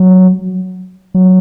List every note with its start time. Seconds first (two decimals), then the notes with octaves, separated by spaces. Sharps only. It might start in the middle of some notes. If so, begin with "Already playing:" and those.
Already playing: F#3
1.14 F#3